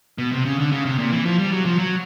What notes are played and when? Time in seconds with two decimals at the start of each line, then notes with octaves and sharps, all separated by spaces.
0.18 B2
0.32 C3
0.45 C#3
0.59 D3
0.72 C#3
0.85 C3
0.98 A#2
1.12 E3
1.26 F3
1.38 G3
1.52 F#3
1.66 F3
1.78 F#3